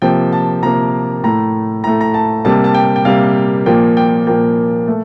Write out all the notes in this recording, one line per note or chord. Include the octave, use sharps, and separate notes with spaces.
C3 F3 A#3 G5
A5
C3 F3 A#3 A#5
A2 A3 A#5
A2 A3 A#5
A#5
A5
C3 G3 A#3 A5
A5
G5
G5
C3 G3 A#3 F5
A#2 F3 A#3 G5
G5
A#2 F3 A#3 G5
A3